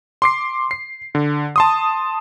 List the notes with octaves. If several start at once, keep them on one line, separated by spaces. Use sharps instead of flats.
C6 D6 C7
C7
D3
A5 C6 D#6